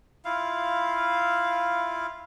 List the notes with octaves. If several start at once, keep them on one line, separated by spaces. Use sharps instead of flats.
E4 F4 F5